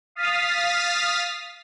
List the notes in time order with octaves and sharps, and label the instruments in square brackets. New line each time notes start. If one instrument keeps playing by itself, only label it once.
[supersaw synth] F5 D#6 F6 A6 B6